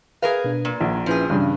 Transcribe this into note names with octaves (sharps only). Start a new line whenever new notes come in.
G#4 A#4 B4 F5
B2 D4
A#2
A#1 F#5 A#5
F3 C#4 E4 G#4 B4
G2 C#3 E3 G3 D4